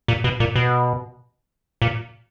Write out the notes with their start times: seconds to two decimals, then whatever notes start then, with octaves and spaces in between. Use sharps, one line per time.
0.08 A#2
0.24 B2
0.40 A#2
0.56 B2
1.82 A#2